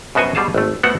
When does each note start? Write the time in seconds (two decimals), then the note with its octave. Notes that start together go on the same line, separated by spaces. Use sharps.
0.15 F#2 B2 B3 F#4 C5 G#5
0.35 B2 G3 F4 G#4 A5
0.55 G#1 A3
0.83 A3 B3 E4 F#4 C5 F#5